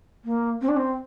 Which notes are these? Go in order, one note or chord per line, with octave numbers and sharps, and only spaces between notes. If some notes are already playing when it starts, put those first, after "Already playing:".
A#3
C4
D4
C4